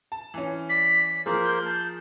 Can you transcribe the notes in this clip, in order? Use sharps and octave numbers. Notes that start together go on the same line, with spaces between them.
A5
E3 C#4
D5 B6
F3 A#3 G#4 A#4 C5
G6
A5